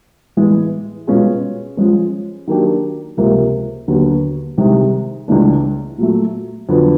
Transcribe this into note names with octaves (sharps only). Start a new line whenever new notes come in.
A2 E3 G#3 B3
B2 G#3 C#4 F4 G#4
F3 G#3 C#4
D#3 F#3 A#3 D4 G4
C#2 C3 F3 A#3
D#2 D3 F#3 B3
C2 C3 D#3 G#3
C#2 C#3 E3 A3 D4
A#2 F#3 A3
F2 D3 F#3 B3 D4